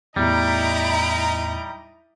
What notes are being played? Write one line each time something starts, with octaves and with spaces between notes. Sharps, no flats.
E2 A2 G3 D#4 E4 D#5 A#5 D7